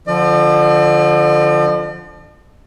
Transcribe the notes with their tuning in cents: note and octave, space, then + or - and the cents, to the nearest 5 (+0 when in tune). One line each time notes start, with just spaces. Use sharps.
D3 +0 F3 +0 D5 +45